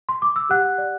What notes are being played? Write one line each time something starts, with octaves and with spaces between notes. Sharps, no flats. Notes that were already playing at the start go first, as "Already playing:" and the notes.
C6
D6
E6
G4 F#5 F#6
D5